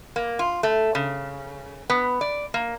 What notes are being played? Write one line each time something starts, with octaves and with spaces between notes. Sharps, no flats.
A#3
F4
A3
C#3
B3
D5
A#3